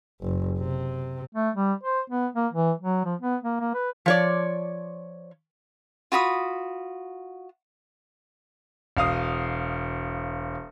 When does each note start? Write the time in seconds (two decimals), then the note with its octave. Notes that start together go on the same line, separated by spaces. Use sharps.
0.22 F#1
0.59 C3
1.35 A3
1.55 G3
1.84 C5
2.10 B3
2.35 A#3
2.53 E3
2.81 F#3
3.05 F3
3.22 B3
3.43 A#3
3.60 A#3
3.75 B4
4.06 F3 C#5 D5
6.12 F4 F#4 B5 D#6
8.97 E1 F5 D#6